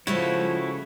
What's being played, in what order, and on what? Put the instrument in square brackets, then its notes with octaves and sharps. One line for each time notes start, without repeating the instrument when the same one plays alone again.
[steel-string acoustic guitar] C#3 G#3 A3 [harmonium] F3 [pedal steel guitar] E4 F#4 C#5